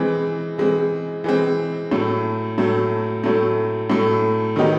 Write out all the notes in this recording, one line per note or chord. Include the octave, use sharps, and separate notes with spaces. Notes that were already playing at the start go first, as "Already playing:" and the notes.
Already playing: E3 G#3 C4
E3 G#3 C4
E3 G#3 C4
A2 F#3 A3
A2 F#3 A3
A2 F#3 A3
A2 F#3 A3
D#3 F#3 B3 D#4 G4